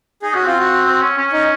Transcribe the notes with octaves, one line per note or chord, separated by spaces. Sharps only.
D#4 G#4
C#4 F#4
C4 F4
F#4
C4
C#4
C#4
D#4